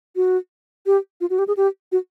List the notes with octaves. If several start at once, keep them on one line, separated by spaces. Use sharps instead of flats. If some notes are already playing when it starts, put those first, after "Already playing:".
F#4
G4
F4
F#4
G4
G#4
G4
F#4